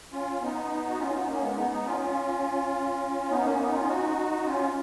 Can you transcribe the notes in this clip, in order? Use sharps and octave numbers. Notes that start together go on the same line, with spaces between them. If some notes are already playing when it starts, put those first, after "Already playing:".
C#4 F4
B3 D#4
F#4
C#4 F4
B3 D#4
A#3 C#4
G#3 B3
B3 D#4
B3 D#4
C#4 F4
C#4 F4
F4
B3 D#4
A#3 C#4
B3 D#4
C#4 F4
D#4 F#4
C#4 F4